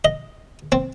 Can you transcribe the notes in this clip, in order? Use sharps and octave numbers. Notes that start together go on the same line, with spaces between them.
D#5
C4